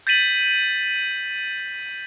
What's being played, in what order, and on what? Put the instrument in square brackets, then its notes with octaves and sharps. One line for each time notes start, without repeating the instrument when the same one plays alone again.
[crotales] G6 A6 B6 D#7 F#7